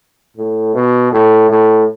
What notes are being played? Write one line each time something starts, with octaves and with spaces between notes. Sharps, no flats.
A2
B2
A2
A2